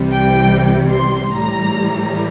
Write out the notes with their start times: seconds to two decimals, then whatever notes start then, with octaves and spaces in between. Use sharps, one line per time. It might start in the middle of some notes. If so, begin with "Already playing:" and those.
Already playing: C2 C3 E3 G3
0.12 G5
0.92 C6
1.33 A2 E3 G3 A#5